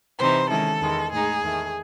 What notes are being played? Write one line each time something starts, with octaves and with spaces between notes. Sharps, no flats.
C3 E3 C4 D#4 C5
D#3 G#3 C#4 E4 A4
E2 D#3 G#3
A2 G#3 D#4 G#4
E2 D#3 A3